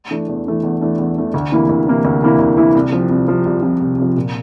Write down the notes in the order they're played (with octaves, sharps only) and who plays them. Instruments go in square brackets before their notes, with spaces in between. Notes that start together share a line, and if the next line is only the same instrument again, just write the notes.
[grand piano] E3 A3 D4
E2
E3 A3 D4
E2
E3 A3 D4
E2
E3 A3 D4
D2
C3 E3 A#3 E4
D2
C3 E3 A#3 E4
D2
C3 E3 A#3 E4
D2
C3 E3 A#3 E4
C2
C3 F3
C2
C3 F3
C2
C3 F3
C2
C3 F3
A#2